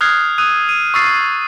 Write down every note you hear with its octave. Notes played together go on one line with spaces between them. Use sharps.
D#6 F6 F#6 G#6 C7
D#6 E6 F#6 D#7
D#7
C#6 D#6 E6 A6 C7